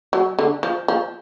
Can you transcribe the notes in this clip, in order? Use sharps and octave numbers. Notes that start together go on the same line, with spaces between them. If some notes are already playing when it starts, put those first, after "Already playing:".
F#3
D3
F3
F3